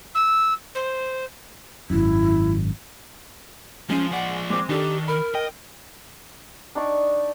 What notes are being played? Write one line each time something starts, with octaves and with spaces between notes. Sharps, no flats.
E6
C5
G#1 F#2 E4
F3 G#3 C#4
F3 D5 F#5
G#3 C4 D6
D#3 D4 G4 A4
A#4 B5
D#5 G5
D4 D#4 D5 C#6